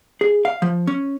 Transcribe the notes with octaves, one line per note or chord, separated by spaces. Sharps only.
G#4
F5
F3
C#4